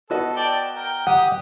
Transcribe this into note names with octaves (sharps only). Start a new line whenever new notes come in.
B3 F#4 A4 D#5
D5 G5 A5
A#4 G5
G4 F#5 D#6